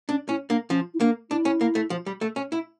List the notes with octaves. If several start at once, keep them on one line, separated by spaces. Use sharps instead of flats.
C#4 D4
C#4 E4
A#3 D4
F3 C#4
E4
A#3 D4
D4 E4
C#4
A#3
A3
F3
G3
A3
C#4
E4